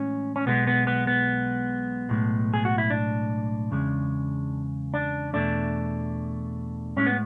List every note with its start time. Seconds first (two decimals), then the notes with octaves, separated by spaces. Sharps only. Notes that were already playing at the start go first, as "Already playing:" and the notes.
Already playing: A2 E3 G#3 C#4
0.36 C#4
0.46 B1 B2 G#3 B3
0.67 B3
0.87 B3
1.07 B3
2.09 B1 A2 G#3
2.54 G#4
2.65 F#4
2.78 E4
2.90 D4
3.71 E2 C#3 G#3
4.94 D4
5.33 E2 B2 A3 D4
6.97 A2 G#3 C#4
7.06 B3